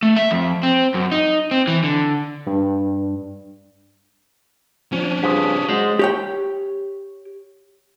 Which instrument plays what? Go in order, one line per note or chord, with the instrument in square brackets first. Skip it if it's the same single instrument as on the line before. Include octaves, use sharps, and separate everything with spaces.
[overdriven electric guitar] A3
E5
F2
C4
F#2
D#4
C4
E3
D3
[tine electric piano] G2
[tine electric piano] F3 [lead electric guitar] C#4 D4
[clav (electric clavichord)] G2 C#3 F3 [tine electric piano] D#6 B6
[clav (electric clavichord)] F#3 [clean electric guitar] G#3 C5
[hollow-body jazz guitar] G4 C#5 G5